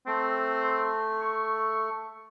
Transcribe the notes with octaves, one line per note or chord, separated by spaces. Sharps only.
A3 C4
C#6